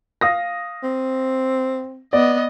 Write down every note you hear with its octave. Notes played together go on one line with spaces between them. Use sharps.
F5 D#6 A#6
C4
B3 D5 D#5